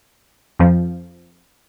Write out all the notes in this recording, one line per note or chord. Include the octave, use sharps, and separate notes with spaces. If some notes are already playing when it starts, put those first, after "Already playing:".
F2 F3